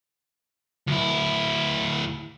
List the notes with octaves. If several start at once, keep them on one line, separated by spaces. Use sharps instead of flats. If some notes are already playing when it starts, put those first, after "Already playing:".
D2 E4